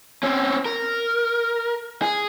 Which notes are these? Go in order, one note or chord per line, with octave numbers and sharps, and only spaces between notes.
C4 C#4
A#4
G#4